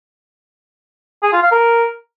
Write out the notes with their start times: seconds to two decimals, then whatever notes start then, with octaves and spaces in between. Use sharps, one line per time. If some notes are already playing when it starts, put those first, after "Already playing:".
1.23 G#4
1.33 F4
1.42 F5
1.52 A#4